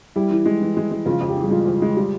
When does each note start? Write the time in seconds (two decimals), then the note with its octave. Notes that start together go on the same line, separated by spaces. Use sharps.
0.16 G3 E4 G4
0.31 E3
0.46 G#3
0.62 E3
0.77 G#3
0.91 G#3
1.06 C#3 F3 F4
1.21 F2
1.28 G4
1.36 E3 G#4
1.43 G3 G4
1.51 F3 G#3 F4
1.66 F2
1.82 G#3
1.97 G3